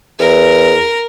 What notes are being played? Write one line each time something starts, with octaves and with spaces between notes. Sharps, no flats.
E2 A#4